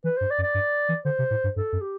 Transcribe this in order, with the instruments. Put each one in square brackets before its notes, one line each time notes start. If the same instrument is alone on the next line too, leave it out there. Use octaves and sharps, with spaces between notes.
[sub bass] E3 [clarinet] B4
[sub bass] G2 [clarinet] C5
[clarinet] D5
[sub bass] F#2
[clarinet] D5
[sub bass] G2
E3
[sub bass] D3 [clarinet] C5
[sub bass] C3
A2
G2
[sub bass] G2 [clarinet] A4
[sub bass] F#2
[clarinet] G4